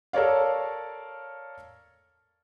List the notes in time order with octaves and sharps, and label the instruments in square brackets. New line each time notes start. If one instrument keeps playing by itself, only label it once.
[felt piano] A4 A#4 C#5 D5 F5